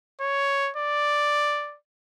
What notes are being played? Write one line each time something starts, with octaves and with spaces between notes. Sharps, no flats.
C#5
D5